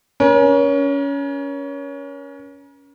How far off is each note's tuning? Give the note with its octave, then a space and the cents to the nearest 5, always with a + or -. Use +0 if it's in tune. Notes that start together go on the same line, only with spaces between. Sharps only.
C#4 +20 A#4 +40